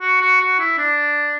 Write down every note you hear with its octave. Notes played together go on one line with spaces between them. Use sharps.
F#4
F#4
F#4
E4
D4